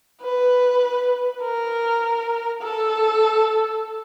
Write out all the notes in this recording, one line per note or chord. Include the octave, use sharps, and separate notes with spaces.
B4
A#4
A4